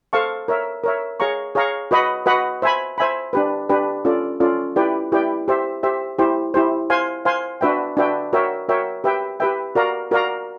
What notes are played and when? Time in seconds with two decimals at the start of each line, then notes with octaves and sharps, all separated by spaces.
0.13 A4 C5 F5 A5 C#6
0.48 A#4 C#5 E5
0.83 A#4 C#5 E5
1.20 G#4 C#5 F5 A#5 C#6
1.55 G#4 C#5 F5 A#5 C#6
1.91 F#4 B4 D#5 F#5 B5
2.26 F#4 B4 D#5 F#5 B5
2.62 C5 E5 G#5 B5
2.98 C5 E5 G#5 B5
3.33 D4 G4 B4
3.69 D4 G4 B4
4.05 C#4 F4 A4 D5
4.40 C#4 F4 A4 D5
4.76 E4 G4 B4 D5 G5
5.12 E4 G4 B4 D5 G5
5.48 G4 C5 E5
5.83 G4 C5 E5
6.19 E4 G4 C5
6.54 E4 G4 C5
6.90 C5 F5 G#5 C6
7.25 C5 F5 G#5 C6
7.61 D4 F#4 B4 E5 G5
7.97 D4 F#4 B4 E5 G5
8.33 F#4 A#4 C#5 E5 G5
8.69 F#4 A#4 C#5 E5 G5
9.04 G4 B4 E5 G5
9.40 G4 B4 E5 G5
9.75 F#4 A#4 D5 F5 A#5
10.11 F#4 A#4 D5 F5 A#5